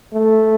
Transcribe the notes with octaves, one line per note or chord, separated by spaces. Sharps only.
A3